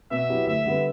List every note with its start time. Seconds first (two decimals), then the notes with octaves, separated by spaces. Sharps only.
0.11 B2 E5
0.29 F#3 B3 E4 G4
0.47 D2 E5
0.66 D3 G3 B3